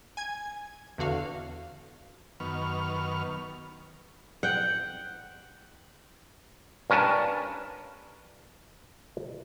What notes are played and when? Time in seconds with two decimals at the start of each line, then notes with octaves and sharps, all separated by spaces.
0.17 G#5 G#6
0.98 E2 D3 F#4 F5
2.40 F#2 D#3 B3 C#6 F6
4.43 F#5 G5
6.90 G2 C#4 A#4 B4 A5